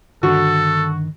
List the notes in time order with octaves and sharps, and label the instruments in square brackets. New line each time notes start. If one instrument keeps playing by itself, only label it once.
[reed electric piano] G2 D3 [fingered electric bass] D#3 [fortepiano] F#4 [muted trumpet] A4